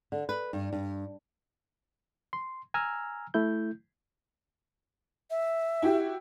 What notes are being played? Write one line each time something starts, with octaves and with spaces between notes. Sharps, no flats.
D3
B4
G2
G2
C6
G#5 A#5 E6 F6
A3 E4 G6
E5
E4 F#4 G4